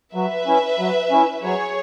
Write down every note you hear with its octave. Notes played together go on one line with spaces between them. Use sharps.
F#3 B4 E5
C#4 E4
F#3
C#4 E4
F#3 G#4 C#5